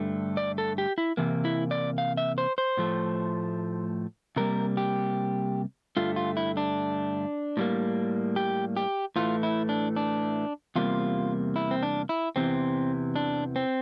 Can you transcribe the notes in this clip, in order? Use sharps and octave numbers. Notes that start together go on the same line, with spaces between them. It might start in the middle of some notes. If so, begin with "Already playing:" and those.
Already playing: G2 D3 A3
D5
A4
G4
E4
C3 E3 A#3
E4
D5
F5
E5
C5
C5
A2 F3 A3
C3 G3 A#3 A#4
G4
G2 D3 A3 F4
F4
E4
D4
A2 G3 A#3
G4
G4
A2 E3 A3 F4
E4
D4
D4
E2 C3 G3 A#3 F4
E4
C4
D4
E4
E2 C3 E3 C4
D4
C4